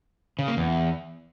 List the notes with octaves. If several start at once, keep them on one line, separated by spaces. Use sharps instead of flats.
C#3
A#3
E2